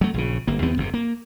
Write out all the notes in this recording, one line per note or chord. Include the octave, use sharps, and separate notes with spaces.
F#3 A3
A#1 C#3
G1 A#3
D#2 B3 C4
F#1 C3
A#3